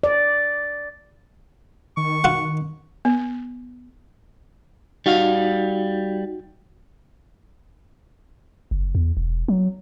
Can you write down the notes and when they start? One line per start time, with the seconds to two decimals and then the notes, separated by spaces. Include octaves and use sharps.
0.03 D5
1.97 D#3 C#6
2.24 F4 F#4 F#5
3.05 B3
5.06 G3 D#4 F#4 F5
8.71 F#1
8.95 E2
9.17 E1
9.48 F#3